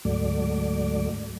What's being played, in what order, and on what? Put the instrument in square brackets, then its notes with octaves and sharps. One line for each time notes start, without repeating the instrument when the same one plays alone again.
[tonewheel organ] D2 G#2 F#3 A3 D5